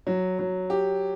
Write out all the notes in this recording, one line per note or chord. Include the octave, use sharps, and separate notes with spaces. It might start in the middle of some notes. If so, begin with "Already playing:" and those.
F#3
F#3
G4